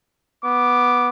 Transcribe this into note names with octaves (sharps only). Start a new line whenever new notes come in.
B3 D6